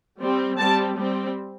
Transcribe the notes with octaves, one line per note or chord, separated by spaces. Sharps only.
G3 C4
G3 C4 A5
G3 C4